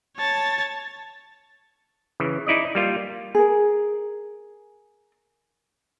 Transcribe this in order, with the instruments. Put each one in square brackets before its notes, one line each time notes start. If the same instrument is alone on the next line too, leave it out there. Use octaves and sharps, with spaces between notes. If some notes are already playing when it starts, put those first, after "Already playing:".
[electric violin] C#5 A5
[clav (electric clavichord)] C#3 E3
D#4 E4 D5 D#5
G3 A#3 F4
[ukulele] G#4 A#4